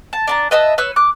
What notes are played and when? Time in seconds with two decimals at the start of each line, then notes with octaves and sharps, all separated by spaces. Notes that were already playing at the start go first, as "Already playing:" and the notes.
0.13 A5
0.27 D4 A5 A#5
0.51 B4 D#5 E5 A5
0.78 B4 C#5 E6
0.96 D6 F#6